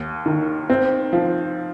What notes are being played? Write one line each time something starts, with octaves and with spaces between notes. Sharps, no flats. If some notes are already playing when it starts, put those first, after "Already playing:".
Already playing: D#2
D#3
C4
F3